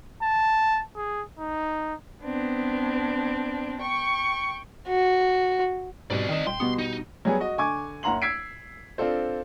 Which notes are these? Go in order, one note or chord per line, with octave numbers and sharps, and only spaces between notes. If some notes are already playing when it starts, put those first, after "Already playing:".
A5
G#4
D#4
B3 C4 D4
G5 C#6
F#4
G#2 B2 G3 C4 D5
D#3 D#4 D#5 E7
D#1 G5 C6
B2 G3 B3
D#4
F#3 G3 B3 G#4
F#4 D#5
D3 G#5 C#6 D6 G#6
F#1 F#5 A#5 C6 F#7
E6 G#6 B6 C7 D7
C4 D4 F4 A4 C5